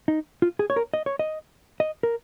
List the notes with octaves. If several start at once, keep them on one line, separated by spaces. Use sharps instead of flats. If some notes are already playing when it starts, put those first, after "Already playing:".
D#4
F4
G#4
C#5
A#4
D#5
C#5
D#5
D#5
A#4